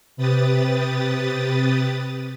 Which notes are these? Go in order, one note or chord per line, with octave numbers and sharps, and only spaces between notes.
C3 G4 B4 D#6 A6